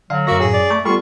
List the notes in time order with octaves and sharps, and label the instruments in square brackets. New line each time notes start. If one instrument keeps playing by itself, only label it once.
[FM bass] D3 [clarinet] F#3 [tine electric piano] F5
[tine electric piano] F#2 C#5 A#6 [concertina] A#3 E5 [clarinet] F#4
[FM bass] A2 [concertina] G#4
[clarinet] D5
[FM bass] A3 [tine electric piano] B5 C#6
[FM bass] G3 [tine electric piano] B3 G4 A4 [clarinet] F4 [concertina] C#6